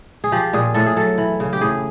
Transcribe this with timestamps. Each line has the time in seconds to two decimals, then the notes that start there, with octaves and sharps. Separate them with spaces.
0.24 G#4
0.32 F3 G4
0.53 A#2 G#4
0.74 A2 A4
0.86 G#4
0.97 F#3 A4
1.18 E3
1.40 C#3
1.53 G4
1.61 A2 G#4